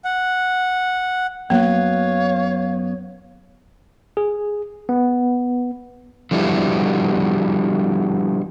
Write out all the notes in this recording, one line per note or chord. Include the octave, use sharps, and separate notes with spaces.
F#5
F#2 F#3 A#3 B3 C#5 F5
G#4
B3
D3 F3 G3 B3 E4